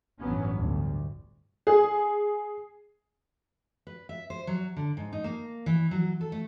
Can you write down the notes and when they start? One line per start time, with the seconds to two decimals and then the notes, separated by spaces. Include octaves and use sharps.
0.19 A1 G2 F#3 B3 C#4
0.54 G1 D2
1.67 G#4
3.87 B4
4.09 E5
4.30 C5
4.47 F#3
4.76 D3
4.97 G#2
5.12 D#4
5.24 A#3
5.66 E3
5.91 F#3
6.21 A4
6.32 A3